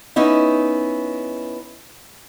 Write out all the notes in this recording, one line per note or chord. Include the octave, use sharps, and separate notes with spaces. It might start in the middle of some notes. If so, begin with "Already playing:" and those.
B3 C#4 D#4 E4